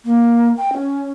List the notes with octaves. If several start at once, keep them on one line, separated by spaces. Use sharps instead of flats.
A#3
G5
C#4